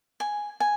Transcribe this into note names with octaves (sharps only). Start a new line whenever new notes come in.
G#5
G#5